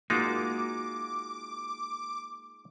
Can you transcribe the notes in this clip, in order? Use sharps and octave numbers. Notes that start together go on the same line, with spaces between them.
G#3 A#3 D#4 F4 F#4 A#4 D6